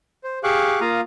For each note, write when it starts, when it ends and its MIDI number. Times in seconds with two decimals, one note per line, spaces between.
0.24 0.39 72
0.44 0.80 67
0.44 0.80 68
0.44 0.80 77
0.44 0.80 85
0.44 0.80 86
0.44 0.80 90
0.81 1.01 58
0.81 1.01 65
0.81 1.01 77
0.81 1.01 82
0.81 1.01 87